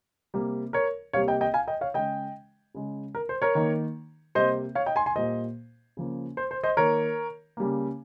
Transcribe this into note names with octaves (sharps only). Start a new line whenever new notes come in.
C3 G3 A#3
A#4 C#5
C3 G3 A#3 C#5 F5
D#5 G5
D#5 G5
F5 G#5
D#5 G5
C#5 F5
C#3 G#3 D#5 G5
C#3 G#3
A#4
C5
A#4 C#5
D#3 A#3
C3 G3 A#3 C5 D#5
C#5 F5
D#5 G5
G#5 C6
G#5 C6
A#2 G3 A#3 C5 D#5
C#3 F3 A#3
C5
C5
C5 D#5
D#3 A#3 A#4 C#5
C#3 G3 A#3